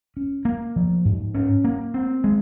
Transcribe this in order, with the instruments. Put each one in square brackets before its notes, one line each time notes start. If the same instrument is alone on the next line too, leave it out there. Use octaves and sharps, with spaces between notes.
[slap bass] C#4
A#3
F3
G#2
C#4
A#3
C4
G#3